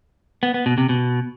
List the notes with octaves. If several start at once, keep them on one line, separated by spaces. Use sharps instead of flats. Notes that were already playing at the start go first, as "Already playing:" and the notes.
B3
B3
B2
C3
B2